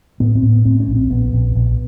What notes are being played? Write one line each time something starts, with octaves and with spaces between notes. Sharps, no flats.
A2 B3
C4
A2
B3
A2 C4
C#4
A#1
C4
A#1 B3
A#1
A#1